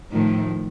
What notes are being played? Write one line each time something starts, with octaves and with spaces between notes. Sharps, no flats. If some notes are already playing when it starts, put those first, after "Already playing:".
A2 D#3 F3